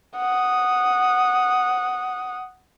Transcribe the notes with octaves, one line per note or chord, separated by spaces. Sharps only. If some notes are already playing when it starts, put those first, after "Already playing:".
F#5 D#6